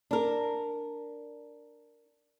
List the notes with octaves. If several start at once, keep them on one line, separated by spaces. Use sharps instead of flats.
D4 A#4